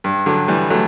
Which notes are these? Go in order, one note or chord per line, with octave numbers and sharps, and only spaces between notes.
G2
D3 F#3
E3 G3
F#3 A3